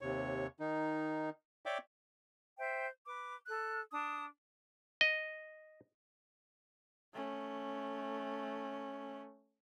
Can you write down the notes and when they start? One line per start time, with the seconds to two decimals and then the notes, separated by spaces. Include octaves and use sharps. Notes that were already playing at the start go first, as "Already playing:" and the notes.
0.01 D#2 C3 C#5
0.60 D#3 D#4
1.66 C#5 D5 E5 G5 D6
2.59 C5 E5 G5 G6
3.05 B4 D6
3.47 A4 F#6
3.92 D4 A5 D#6
5.01 D#5
7.13 A3 C#4